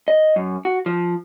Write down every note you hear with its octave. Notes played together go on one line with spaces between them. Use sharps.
D#5
F#2
F#4
F3